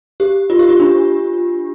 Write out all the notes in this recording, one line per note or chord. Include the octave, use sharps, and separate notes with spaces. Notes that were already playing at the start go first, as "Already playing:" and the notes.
G4
F4
G4
F4
D4